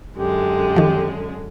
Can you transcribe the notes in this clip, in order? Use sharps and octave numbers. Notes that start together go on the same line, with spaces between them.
F#2 D3 G#3 G4
D#3 F3